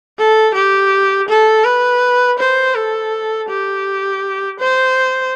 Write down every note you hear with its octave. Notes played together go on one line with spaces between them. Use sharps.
A4
G4
A4
B4
C5
A4
G4
C5